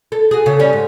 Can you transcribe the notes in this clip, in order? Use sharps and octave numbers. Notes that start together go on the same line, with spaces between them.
A4
F#4 G#4
C#3 A4
G3 C#4
G#2